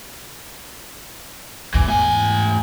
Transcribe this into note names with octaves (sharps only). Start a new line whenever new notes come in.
E2 G#2 E3
A2 G#5